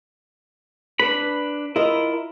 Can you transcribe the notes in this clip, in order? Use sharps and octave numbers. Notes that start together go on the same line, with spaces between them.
D4 B4 B5
E4 F4 A#4 D#5